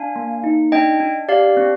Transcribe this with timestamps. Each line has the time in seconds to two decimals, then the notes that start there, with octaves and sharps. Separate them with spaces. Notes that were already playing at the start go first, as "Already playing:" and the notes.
Already playing: D4 F5 G#5
0.16 A#3
0.44 D#4
0.72 D4 D#5 G5
1.00 D4
1.29 G4 D5 F5
1.57 C4